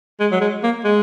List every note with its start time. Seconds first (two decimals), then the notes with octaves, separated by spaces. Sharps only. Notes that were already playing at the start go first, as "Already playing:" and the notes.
0.20 G#3
0.32 F#3
0.41 G#3
0.63 A#3
0.84 G#3